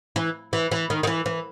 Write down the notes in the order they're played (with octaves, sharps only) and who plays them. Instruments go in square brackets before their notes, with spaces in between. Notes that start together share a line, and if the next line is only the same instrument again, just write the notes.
[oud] E3
E3
E3
D#3
D#3
E3
E3